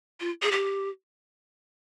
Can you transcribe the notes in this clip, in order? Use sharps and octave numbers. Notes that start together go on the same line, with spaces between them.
F4
G#4
G4